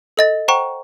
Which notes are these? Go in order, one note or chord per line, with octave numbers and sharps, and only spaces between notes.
A4 D#5 A6
C5 F#5 G5 A#5 C#6